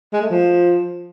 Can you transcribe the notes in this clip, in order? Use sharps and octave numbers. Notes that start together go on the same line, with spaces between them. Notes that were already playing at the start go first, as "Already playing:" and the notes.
G#3
A3
F3